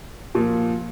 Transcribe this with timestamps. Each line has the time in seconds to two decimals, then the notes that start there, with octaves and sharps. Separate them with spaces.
0.35 A#2 F3